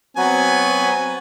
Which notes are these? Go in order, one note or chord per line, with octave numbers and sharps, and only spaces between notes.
F#3 B3 C4 F#4 G#5